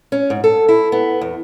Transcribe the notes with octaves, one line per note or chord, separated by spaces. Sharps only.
C#4
G#2
A4
E4
B3
E2